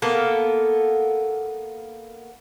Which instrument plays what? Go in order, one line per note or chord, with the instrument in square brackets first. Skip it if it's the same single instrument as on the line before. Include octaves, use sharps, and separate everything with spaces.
[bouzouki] A#3 B3 A4